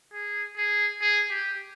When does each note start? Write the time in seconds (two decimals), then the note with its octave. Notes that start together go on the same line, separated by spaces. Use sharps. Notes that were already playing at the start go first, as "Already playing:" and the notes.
0.13 G#4
0.57 G#4
1.01 G#4
1.31 G4